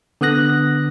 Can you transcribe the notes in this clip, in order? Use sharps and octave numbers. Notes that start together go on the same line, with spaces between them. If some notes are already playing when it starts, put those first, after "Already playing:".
D3 B3 D#6 F#6 A#6